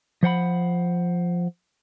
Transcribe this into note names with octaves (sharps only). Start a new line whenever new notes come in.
F3 C5 F#5 B5